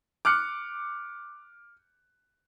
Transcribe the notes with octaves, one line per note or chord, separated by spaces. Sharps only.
D6 F6 F#6 C#7